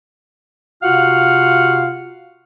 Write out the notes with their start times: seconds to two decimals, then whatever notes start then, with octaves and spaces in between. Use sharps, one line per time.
0.83 C3 F4 F#4 F5 F#5 F6